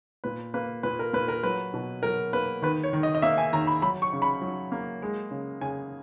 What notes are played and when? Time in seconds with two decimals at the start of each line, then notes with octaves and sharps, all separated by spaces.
0.24 A#2 B4
0.54 A#3 B4
0.83 A#2 B4
0.99 A#4
1.13 A#2 B4
1.28 A#4
1.43 F#3 B4
1.74 B2
2.03 F#3 A#4
2.33 A#3 B4
2.62 D#3 B4
2.83 C#5
2.93 D#3
3.03 D#5
3.15 D#5
3.22 A#3 E5
3.38 G#5
3.53 D#3 A#5
3.67 B5
3.82 F#3 B5
4.02 C#6
4.13 C#3
4.22 B5
4.41 F#3
4.72 A#3
5.02 G#3
5.31 C#3
5.61 C#3 G#5